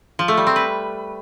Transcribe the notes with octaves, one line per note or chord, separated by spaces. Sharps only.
F3
A3
G3
C4
B4